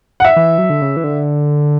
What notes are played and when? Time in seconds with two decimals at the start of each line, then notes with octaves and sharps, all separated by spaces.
0.20 F#5
0.25 E5
0.36 E3
0.58 F#3
0.70 D3
0.82 C#3
0.97 E3
1.04 D3